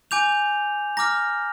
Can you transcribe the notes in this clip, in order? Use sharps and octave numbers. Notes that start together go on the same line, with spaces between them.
G#5 D6 G6 F7
A#5 D6 F6 A#6